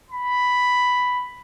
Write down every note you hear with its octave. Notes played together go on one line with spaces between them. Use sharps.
B5